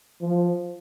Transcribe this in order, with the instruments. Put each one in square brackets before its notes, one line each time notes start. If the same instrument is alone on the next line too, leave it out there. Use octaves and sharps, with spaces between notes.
[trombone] F3